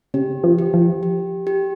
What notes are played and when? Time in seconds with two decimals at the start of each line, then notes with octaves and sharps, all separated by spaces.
0.14 C#3 G4
0.44 F3
0.59 G4
0.74 F3
1.03 G4
1.47 G4